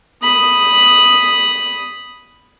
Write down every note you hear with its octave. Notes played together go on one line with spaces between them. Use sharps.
B5 D#6